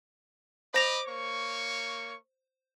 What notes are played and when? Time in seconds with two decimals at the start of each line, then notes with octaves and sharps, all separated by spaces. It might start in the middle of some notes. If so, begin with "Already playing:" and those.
0.74 C5 D#5 B5 D6 A#6 F7
1.07 A#3 C#5 C#6